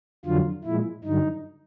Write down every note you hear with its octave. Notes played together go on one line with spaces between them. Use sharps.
F2 D3 F#3 F4
A#2 F3 G#3 E4
G2 D3 F#3 D#4